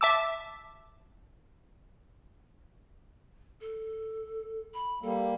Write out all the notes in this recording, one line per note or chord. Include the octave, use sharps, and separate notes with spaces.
E5 A5 D6 E6
A4
B5
G3 A#3 A4